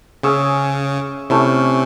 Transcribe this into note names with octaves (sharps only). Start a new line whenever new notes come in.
C#3 C#4 G#4 C#5 E5
C3 A3 C#4 E4